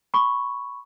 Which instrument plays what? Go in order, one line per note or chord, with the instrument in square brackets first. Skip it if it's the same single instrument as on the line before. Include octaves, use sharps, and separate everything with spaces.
[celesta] B5 C#6